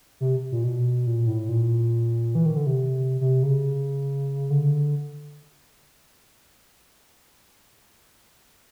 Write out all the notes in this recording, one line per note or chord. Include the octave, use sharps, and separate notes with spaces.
C3
A#2
B2
A#2
A2
A#2
E3
D#3
D3
C3
C3
C#3
D3